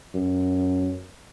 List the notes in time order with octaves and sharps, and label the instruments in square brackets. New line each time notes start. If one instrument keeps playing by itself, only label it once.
[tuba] F#2